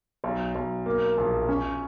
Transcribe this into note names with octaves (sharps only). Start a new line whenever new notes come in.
B1
B1
A#3
A#1
C#4